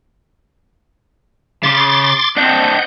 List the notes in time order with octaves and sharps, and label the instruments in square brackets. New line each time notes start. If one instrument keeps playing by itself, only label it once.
[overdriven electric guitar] C#3 [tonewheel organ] C6 D6 A6
[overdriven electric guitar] C4 D4 [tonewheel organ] D#5 F#5 G6